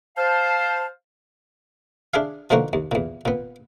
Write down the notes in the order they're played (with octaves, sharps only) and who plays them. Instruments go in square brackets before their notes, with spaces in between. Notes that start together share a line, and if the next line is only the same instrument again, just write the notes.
[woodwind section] C5 F5 A5
[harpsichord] D4 E4 G#4 F5
B2 D3 F3 A#3 D#4 F#4
D#2
E2 A#2
A#2 B3